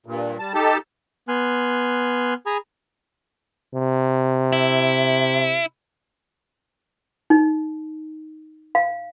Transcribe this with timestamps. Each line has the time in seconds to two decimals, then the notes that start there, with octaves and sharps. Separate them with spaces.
0.06 G2 A#2
0.39 G3 A5
0.54 D#4 G4 A4 A5
1.28 B3 G#5 C6 F6 F#6
2.46 G#4 G#5 A#5 B5 D#6
3.75 C3
4.52 E4
7.30 D#4
8.75 F5